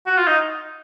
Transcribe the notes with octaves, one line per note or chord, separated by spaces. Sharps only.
F#4
F4
D#4